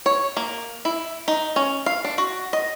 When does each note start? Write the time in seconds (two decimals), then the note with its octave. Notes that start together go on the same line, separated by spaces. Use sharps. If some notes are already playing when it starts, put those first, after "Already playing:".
0.06 C#5
0.37 A#3
0.85 E4
1.28 D#4
1.56 C#4
1.86 F5
2.04 D4
2.18 F#4
2.53 D#5